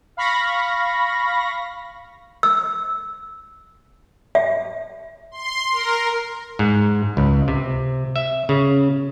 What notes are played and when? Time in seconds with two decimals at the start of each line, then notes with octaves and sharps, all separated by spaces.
0.17 F5 B5 C#6 A#6
2.43 E6
4.35 E5
5.31 C6
5.71 A#4
6.59 G#2
7.17 C#2
7.48 C3
8.16 E5
8.49 C#3